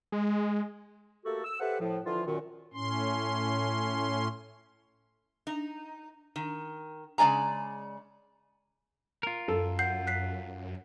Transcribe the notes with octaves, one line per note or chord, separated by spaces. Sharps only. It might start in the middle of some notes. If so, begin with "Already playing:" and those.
G#3
A3 A#3 F#4 G4 A4
E6
G4 A4 B4 C5 E5 F#5
A2 F3
D3 E3 F3 F4
F#2 A#2 D#3
A2 C#4 C6
D#4
D#3
C#3 G#3 D5 G#5 A#5
F4 A#4
F#2 A4
F#5 G6 C7
F#6 B6 C7